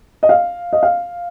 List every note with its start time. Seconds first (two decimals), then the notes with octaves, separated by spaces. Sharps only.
0.23 D#5
0.29 F5
0.73 D#5
0.83 F5